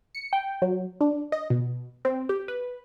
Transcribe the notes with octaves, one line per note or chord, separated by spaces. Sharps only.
C#7
G5
F#3
D4
D#5
B2
C4
G4
B4